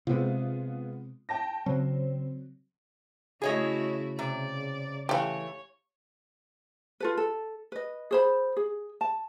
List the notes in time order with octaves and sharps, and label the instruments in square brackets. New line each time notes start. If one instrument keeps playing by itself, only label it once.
[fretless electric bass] C3 [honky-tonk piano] G#3 B3 F4
[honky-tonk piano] G5 A5 A#6
[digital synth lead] C#3 [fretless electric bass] F#3 [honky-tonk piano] C4
[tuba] C#3 [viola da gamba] A3 E4 F#4 [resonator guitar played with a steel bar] G#4 C#5 D#5
[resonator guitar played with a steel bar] C3 [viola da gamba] D5
[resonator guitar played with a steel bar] E3 A3 [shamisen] G4 F5 [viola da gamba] C#5
[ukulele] F4 A4 B4
A4
B4 D#5
G#4 C5 B5
G#4
A5